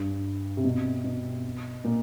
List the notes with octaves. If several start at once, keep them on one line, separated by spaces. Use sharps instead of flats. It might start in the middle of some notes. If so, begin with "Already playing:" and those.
Already playing: G2
C3
B2
B2
A#2